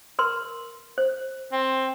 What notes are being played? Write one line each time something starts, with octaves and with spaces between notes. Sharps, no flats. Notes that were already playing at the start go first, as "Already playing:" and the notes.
A#4 B4 C6
C5
C4